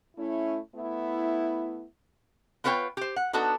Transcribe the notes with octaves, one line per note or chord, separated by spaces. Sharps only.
A3 C#4 E4
A3 B3 E4
B3 F4 B4 C#5 E5 G5
G4 C5
F#5
B3 D4 D#4 F#4 A4